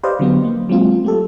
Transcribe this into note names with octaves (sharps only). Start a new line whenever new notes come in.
G4 B4 C5 D5 D#5 F5
D3 F#3 B3 D4
A#3
F#3 G#3 C4 F4
A3 G4 A4